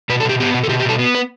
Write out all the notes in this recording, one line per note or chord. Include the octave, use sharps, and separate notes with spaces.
B2 B4
A4
B2 G4
B3 G4
B2
A4
B2 G4
G4
B2 A4
B3
B4